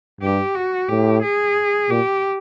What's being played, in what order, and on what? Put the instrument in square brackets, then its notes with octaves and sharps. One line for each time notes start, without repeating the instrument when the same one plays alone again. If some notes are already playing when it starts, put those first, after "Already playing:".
[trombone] G2 [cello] G4
[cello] F#4
[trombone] A2 [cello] G4
[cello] G#4
[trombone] A#2 [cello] G4